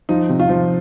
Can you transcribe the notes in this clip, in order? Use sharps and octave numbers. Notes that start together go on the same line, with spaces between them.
F3 D#4
C3
F4
F3